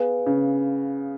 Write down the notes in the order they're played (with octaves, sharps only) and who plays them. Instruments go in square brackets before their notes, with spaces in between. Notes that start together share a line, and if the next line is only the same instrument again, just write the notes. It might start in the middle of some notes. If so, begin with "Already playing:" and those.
Already playing: [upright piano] B3 [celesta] G#4 B4 F5 G#5
[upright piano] C#3